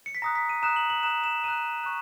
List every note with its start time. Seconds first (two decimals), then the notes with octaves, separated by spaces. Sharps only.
0.06 C#7
0.15 B6
0.22 A#5 D#6 F#6 A#6
0.36 B6
0.49 D#7
0.62 A#5 D#6 F#6 E7
0.76 F#7
0.90 F#7
1.03 A#5 D#6 F#6 E7
1.24 E7
1.44 A#5 D#6 F#6 D#7
1.84 C#6 F#6